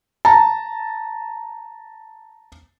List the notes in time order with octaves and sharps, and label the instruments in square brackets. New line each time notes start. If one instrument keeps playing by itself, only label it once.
[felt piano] A5 A#5